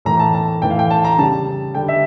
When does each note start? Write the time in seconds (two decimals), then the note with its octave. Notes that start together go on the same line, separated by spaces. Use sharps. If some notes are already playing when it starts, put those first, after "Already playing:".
0.05 A2 E3 A3 A#5
0.19 A5
0.34 A5
0.62 A2 E3 A3 G5
0.70 F5
0.79 G5
0.90 A5
1.04 A#5
1.18 C#3 G3 A5
1.74 D3 G3 G5
1.88 E5